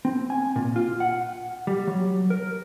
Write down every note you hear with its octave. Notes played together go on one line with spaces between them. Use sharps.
C4
G#5
A#2
F4
F#5
G3
F#3
A#4